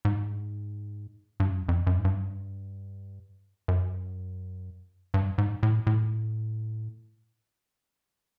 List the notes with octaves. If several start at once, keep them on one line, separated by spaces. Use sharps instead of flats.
G#2
G2
F#2
F2
F#2
G#2
G2
F#2
G2
G#2
A2
A2